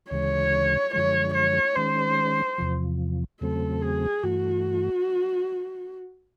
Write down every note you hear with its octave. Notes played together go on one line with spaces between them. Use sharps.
D2 C#3 E3 G#3 C#5
F#2 D3 F3 G#3 C#5
C#5
D#3 G#3 C#4 C5
E2 C3 F3
E2 C#3 F#3 A3 C4 A4
G#4
G2 E3 A3 F#4